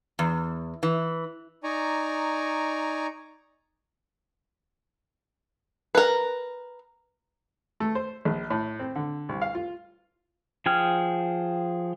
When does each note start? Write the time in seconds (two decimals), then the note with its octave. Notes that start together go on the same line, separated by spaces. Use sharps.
0.19 E2
0.83 E3
1.64 D#4 D5 G#5 A#5 C#6
5.95 A#4 B4
7.80 A3
7.95 C5
8.25 A#1
8.50 A2
8.79 C4
8.96 D3
9.29 C2
9.42 F5
9.55 F4
10.66 F3 G#4 G5 F6